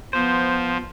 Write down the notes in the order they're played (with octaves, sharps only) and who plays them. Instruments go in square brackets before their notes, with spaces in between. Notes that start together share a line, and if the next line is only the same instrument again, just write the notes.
[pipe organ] F3 [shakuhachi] B3 [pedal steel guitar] C5